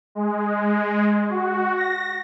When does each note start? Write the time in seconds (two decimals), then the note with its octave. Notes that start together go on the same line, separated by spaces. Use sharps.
0.15 G#3
1.30 F#4
1.77 A#6